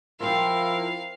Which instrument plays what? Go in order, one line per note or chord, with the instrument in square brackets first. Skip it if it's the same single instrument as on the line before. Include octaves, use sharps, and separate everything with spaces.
[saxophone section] F3 E4 A#4 [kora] C4 F4 [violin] F5